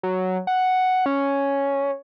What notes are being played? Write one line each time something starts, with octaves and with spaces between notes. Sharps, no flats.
F#3
F#5
C#4